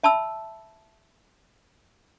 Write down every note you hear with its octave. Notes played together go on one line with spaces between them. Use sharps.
E5 A5 B5 E6